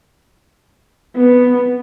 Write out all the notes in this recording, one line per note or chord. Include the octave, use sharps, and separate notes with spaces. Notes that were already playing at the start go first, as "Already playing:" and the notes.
B3